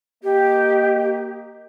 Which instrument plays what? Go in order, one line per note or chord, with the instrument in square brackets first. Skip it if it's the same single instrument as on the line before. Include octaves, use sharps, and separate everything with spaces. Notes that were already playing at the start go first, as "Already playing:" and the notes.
[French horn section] A#3 D#5 [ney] G4